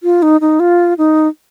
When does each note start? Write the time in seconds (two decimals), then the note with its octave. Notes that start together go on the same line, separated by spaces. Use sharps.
0.03 F4
0.22 D#4
0.41 D#4
0.60 F4
0.98 D#4